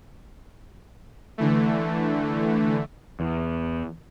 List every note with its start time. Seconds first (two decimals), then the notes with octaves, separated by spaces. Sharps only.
1.38 D3 E3 A3
3.20 E2